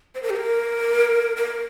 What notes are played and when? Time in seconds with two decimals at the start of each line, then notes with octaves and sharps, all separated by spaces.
0.15 C5
0.23 A#4
0.30 G4
0.37 A#4
1.37 A#4